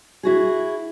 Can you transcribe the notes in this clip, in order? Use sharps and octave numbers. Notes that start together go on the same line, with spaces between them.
E4 F#4 G#4